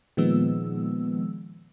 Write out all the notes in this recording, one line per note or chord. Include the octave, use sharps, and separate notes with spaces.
A#2 D#3 F3 G#3 B3 E6